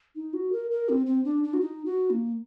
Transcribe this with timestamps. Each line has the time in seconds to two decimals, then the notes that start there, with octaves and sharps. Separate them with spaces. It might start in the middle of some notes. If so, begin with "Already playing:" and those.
0.16 D#4
0.34 F#4
0.52 A#4
0.71 A#4
0.89 C4
1.06 C4
1.25 D4
1.44 D4
1.54 F#4
1.61 D#4
1.86 F#4
2.10 A#3